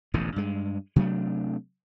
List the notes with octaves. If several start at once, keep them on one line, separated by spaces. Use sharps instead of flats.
E1 A1 G#2 D3
G2 G#3
C3 F#3 A3 D4